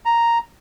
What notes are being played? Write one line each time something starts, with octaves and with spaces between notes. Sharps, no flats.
A#5